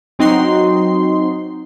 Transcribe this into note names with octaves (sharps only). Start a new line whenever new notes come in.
F#3 C4 D#4 F#4 C6